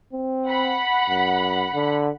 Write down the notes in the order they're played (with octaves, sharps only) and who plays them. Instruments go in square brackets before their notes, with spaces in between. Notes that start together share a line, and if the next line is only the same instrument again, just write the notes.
[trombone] C4
[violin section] F#5 B5
[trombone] F#2
D3